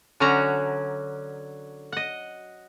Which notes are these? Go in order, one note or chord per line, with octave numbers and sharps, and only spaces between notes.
D3 F#3 C#4 F#4 A#5
D#5 F#5